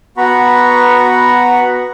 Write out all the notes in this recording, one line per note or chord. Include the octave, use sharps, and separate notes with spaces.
B3 F#4 F#5 A#5 B5 C#6